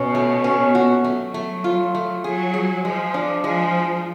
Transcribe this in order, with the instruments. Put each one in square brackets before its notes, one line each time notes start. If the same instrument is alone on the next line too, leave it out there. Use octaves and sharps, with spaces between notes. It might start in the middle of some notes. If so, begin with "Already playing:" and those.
Already playing: [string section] B2 [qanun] C#4
[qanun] A3
C#4
F#4
[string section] F#3 [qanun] A3
[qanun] A3
F4
A3
[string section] F#3 [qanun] G#4
[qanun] G#4
[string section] F3 [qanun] G#3
[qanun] D4
[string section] F3 [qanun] G#3